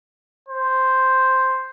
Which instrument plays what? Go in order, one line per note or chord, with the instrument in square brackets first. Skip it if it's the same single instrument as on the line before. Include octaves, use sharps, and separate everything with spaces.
[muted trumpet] C5